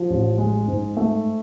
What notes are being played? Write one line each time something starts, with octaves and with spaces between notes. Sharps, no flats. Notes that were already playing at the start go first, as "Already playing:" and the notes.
Already playing: F3
A1
G#3
G#2
A3